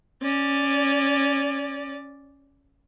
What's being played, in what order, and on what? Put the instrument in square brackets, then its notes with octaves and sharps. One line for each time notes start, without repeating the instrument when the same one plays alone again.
[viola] C#4 D5